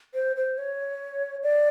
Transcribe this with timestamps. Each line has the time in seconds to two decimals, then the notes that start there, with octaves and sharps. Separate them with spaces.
0.14 C5
0.36 C5
0.58 C#5
1.43 D5